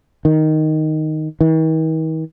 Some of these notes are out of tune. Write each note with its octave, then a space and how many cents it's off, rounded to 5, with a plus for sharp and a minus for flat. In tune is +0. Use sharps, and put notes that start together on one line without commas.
D#3 +0
D#3 +45